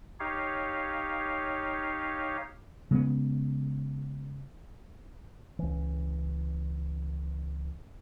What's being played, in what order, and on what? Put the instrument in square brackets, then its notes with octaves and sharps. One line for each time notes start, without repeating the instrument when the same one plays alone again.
[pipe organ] D#4 G4 C#5 F5
[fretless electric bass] C#3 G#3 A#3 B3
[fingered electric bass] C#2 E3